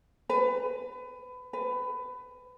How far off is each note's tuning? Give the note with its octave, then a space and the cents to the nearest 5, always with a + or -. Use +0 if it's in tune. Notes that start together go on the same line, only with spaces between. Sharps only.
B4 +25
B4 +20